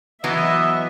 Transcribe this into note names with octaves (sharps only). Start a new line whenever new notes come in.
E3 F#3 B3 D#5 E5